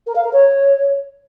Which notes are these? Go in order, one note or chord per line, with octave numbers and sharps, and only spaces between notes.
A#4
F5
A#4
C#5